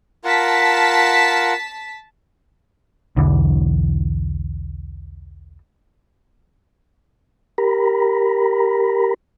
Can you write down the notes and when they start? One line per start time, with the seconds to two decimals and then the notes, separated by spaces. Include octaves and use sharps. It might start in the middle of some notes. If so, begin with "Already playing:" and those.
0.24 F4 A#4 F#5 A5 B6
3.17 B1 E2 D3 E3
7.58 G4 A#4 A#5 B5